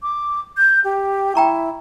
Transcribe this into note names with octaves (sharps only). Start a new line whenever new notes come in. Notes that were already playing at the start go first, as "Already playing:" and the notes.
D6
G6
G4
E4 G5 A#5 C#6